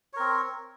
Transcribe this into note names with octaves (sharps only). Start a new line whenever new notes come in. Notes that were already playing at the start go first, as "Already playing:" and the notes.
C4 A#4 C#5